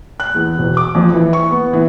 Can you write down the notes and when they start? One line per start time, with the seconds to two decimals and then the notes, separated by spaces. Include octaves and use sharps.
0.20 F#6
0.35 E2
0.58 E1
0.77 D6
0.95 F2
1.13 E3
1.33 C#6
1.51 B3
1.73 E3